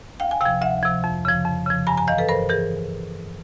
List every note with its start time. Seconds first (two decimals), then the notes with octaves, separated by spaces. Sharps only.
0.20 D2 F5 G5
0.31 G#5
0.41 C3 F3 F5 G5
0.62 D2 E5 F#5
0.83 C3 F3
1.04 F2
1.25 C#3 F3
1.45 F2
1.66 C#3 F3
1.87 G2 G#5 A#5
1.97 G#5 A#5
2.08 E3 D#5 F5
2.18 A4 B4
2.29 G2 A#4 C5
2.49 E3 G#4 A#4